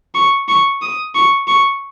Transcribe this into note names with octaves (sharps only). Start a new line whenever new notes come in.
C#6
C#6
D#6
C#6
C#6